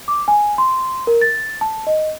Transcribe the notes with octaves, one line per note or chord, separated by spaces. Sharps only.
D6
G#5
C6
A#4
A6
A5
D#5